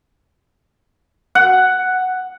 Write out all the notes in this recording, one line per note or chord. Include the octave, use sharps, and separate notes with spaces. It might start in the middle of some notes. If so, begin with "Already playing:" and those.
F#5